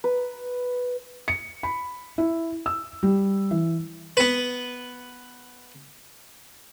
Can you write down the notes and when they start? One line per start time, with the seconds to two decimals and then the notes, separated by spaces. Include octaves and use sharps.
0.04 B4
1.28 C#7
1.63 B5
2.18 E4
2.66 E6
3.03 G3
3.51 E3
4.17 B3 B4